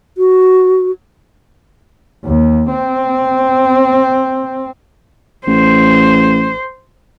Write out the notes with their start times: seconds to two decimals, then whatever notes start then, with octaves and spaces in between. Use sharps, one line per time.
0.18 F#4
2.25 D#2
2.71 C4
5.47 A1 C5